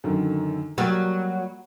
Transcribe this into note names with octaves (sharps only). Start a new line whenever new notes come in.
F#2 D3 D#3
F#3 G3 A#3